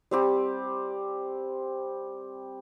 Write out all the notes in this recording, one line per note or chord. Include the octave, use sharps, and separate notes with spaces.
G3 C4 G4